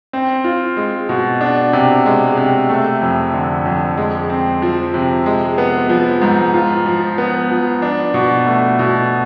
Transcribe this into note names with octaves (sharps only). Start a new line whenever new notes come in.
C4
F4
G#3
B2
D4
C3
G#3
C3
A3
F2
D3
F2
G#3
C4
F3
C3
G#3
B3
F3
G#2
F4
F3
B3
F3
D4
B2
A3
B2